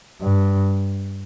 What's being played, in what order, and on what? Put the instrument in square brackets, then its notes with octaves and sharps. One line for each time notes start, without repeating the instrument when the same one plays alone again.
[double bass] G2